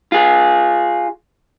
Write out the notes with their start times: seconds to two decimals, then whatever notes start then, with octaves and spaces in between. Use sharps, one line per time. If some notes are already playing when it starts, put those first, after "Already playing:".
0.12 F4 G#4